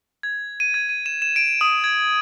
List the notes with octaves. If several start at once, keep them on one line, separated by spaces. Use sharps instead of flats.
G#6
D#7
G#6
D#7
E7
E7
D7
D#6
G#6